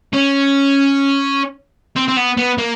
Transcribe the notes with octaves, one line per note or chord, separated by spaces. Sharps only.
C#4
C4
C4
B3
B3
A#3